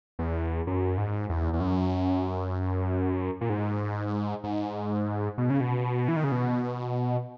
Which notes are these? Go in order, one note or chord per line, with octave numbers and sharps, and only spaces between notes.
E2
F#2
G#2
E2
E2
F#2
A#2
G#2
G#2
B2
C#3
B2
E3
D#3
C#3
B2